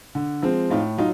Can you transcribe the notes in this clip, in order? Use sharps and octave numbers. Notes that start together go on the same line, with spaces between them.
D3
F3 G#3 C4
A2 D#4 F4
F#3 D#4 F4